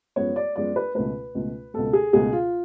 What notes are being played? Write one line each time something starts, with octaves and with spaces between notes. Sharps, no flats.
F#2 F3 G#3 B3 C#5
D5
F#2 F3 G#3 B3 D5
B4
C#2 B2 A3 B4
C#2 B2 A3
C#2 B2 A3 A4
G#4
C#2 B2 A3 G#4
F4